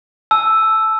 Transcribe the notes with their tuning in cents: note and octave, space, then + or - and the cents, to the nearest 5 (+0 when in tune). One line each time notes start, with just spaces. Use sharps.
A5 -20 E6 +0